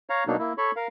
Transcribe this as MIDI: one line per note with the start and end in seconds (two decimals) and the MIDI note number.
0.10 0.24 73
0.10 0.24 77
0.10 0.24 82
0.27 0.36 47
0.27 0.36 54
0.27 0.36 58
0.27 0.36 62
0.27 0.36 63
0.39 0.53 58
0.39 0.53 64
0.58 0.71 69
0.58 0.71 73
0.58 0.71 83
0.58 0.71 85
0.76 0.87 70
0.76 0.87 77